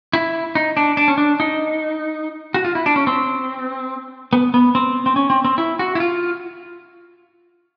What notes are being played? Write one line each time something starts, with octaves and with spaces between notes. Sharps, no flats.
E4
D#4
D4
D4
C#4
D4
D#4
F#4
F4
E4
D4
C#4
C4
B3
B3
C4
C4
C#4
C4
C4
E4
F#4
E4
F4